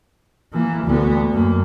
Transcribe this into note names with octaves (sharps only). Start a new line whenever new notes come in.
E3 A#3
D2 B3
F#2 A#3